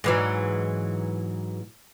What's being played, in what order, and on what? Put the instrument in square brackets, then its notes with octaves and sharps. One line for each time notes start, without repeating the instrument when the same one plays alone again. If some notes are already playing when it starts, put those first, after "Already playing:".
[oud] G#2 E3 F#3